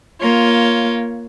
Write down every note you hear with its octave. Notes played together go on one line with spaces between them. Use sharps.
A#3 F4 C#5